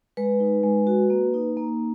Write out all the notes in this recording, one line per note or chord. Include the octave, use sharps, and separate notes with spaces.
G#3 B4
D#4
G#3
F#4
A#3
D#4
A#3